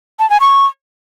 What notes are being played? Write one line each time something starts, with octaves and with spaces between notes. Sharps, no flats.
A5
G#5
C#6